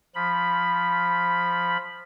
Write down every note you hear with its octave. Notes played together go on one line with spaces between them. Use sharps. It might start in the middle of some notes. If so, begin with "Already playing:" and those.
F3 B5